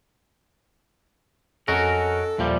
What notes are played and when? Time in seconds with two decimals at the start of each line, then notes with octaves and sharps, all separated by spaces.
1.68 F2 C#4 F#4 A4 A#4 D#5 G#5
2.39 D#2 A#2 F3 G3 E5 F5